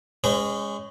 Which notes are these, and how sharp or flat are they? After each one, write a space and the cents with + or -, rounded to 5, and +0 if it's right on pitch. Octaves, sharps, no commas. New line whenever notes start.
G#3 -15 C#4 +5 C5 -40